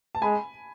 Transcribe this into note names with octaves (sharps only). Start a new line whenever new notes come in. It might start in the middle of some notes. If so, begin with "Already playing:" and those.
A5
G#3 G#5 B5